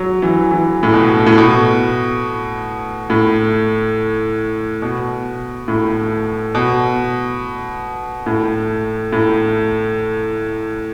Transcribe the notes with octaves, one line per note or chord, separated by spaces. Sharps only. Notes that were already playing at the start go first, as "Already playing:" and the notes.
Already playing: F#3
E3
E3
A2
B2
A2
B2
A2
B2
A2
B2
A2
A2